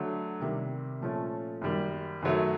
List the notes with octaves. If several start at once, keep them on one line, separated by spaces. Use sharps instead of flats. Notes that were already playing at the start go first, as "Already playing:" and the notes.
Already playing: D3 F#3 A3
C3 D#3 G3
A#2 F3 A3 C#4
F#2 D#3 G3 A#3
F#2 D#3 F#3 A3